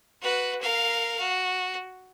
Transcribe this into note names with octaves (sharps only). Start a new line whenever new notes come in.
F#4 B4
A#4 F5
F#4